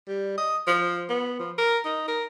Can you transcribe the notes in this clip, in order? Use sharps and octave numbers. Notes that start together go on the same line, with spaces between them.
G3
D#5
F3
B3
F3
A#4
D#4
A#4